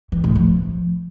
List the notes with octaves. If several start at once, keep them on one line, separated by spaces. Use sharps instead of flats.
E3
A2
F3